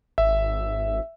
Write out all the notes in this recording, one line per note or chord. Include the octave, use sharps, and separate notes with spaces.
G#1 E5